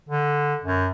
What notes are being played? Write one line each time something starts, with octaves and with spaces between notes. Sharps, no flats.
D3
F#2